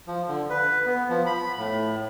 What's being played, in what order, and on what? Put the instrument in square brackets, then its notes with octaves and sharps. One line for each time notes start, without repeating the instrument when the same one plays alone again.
[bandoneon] F3
D3
B4
B3
F3
B5
A2